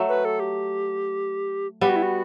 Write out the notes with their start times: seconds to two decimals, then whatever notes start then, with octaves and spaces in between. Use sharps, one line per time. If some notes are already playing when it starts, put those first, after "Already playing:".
Already playing: F#3 A3
0.09 B4
0.25 A4
0.40 G4
1.81 G3 B3 G4
1.89 F#4
1.96 E4
2.03 F#4